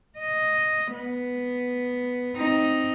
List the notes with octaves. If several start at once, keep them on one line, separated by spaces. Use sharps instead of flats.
D#5
B3
C4 D#4